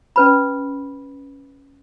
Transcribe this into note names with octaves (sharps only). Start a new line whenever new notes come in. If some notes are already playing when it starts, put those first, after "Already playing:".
C#4 B4 B5